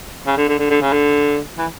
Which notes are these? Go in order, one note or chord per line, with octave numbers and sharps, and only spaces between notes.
C#3
D3
D3
D3
D3
C#3
D3
E3